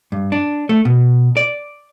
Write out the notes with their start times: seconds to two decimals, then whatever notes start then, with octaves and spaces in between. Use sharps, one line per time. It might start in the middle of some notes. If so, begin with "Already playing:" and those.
0.12 G2
0.32 D4
0.69 A3
0.85 B2
1.37 D5